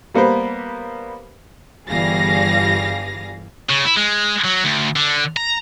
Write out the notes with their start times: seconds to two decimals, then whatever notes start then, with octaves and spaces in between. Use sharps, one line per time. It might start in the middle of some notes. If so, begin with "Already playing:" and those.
0.14 G3 A#3 B3 B4 C5
1.89 G1 E3 G3 G#4 F5 A#6
3.70 C#3
3.85 E4
3.97 G#3
4.45 F#3
4.64 D2
4.96 D3
5.37 A#5